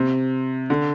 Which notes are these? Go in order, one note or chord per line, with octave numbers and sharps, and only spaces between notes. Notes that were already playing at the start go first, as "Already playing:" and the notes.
Already playing: C3
D3